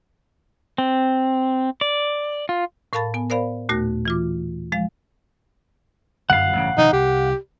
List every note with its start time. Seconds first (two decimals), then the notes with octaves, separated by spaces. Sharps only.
0.78 C4
1.81 D5
2.49 F4
2.93 A2 A#4 F5 A5 B5 A6
3.14 B3 G#5
3.30 A#4 C5 D5 F5 B5
3.69 D#2 A#2 A3 F#4 A#6
4.05 E3 F4 D6
4.72 F3 G#3 F5
6.30 G1 F#2 B3 F5 F#5
6.53 A1 G2 C#3
6.78 B2 D#3 F3 D#4
6.93 C2 G4